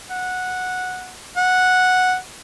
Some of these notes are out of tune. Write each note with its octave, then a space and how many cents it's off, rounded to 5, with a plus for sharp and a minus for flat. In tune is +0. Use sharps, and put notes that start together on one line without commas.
F#5 -10
F#5 -5